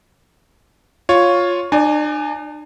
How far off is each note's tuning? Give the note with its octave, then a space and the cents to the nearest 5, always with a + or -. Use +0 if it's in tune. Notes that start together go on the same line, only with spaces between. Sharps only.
F4 +10 C#5 +0
D4 +45 D5 +0 G#5 +5